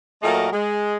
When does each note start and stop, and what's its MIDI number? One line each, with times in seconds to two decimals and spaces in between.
0.23 0.48 46
0.23 0.48 54
0.23 0.48 57
0.23 0.48 69
0.23 0.48 70
0.23 0.48 75
0.53 0.97 56